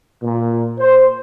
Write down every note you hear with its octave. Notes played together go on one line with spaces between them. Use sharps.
A#2
C5